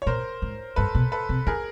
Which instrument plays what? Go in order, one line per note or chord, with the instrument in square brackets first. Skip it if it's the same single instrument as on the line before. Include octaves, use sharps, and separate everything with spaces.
[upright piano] C#5
[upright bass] A#2 [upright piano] A#4 C5
[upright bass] G#2
[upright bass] G2 [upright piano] A4 B4
[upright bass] B2
[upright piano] A4 B4
[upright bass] C3
[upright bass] D3 [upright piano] G#4 A#4